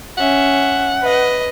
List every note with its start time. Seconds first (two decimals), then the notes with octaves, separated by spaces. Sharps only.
0.18 C#4 E5 F#5
1.02 B4 D#5